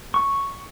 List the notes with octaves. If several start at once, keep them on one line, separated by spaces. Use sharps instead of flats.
C#6